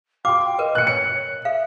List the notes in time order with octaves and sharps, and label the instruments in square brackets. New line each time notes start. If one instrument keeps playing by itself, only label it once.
[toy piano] F#4 D6 [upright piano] F5 [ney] G5
[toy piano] A#4 B4 [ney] D#5
[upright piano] F#6 C#7
[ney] C#5 [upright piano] C#7
[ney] E5 [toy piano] F5